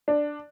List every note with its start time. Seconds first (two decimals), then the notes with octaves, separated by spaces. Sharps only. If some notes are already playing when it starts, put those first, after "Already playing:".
0.08 D4